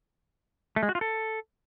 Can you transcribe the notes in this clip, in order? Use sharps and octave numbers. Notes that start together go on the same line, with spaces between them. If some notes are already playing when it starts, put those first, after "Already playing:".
A3
G#3
F#4
F4
A4